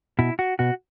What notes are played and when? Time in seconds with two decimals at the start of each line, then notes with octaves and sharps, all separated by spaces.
0.19 B2 E4
0.39 F#4
0.59 B2 F#4